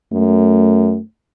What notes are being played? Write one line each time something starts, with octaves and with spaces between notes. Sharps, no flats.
F#2 A3